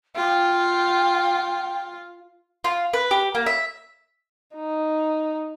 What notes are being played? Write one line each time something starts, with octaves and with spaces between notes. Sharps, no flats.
F4 G5
F4
B4
G4
A#3
E5
D#4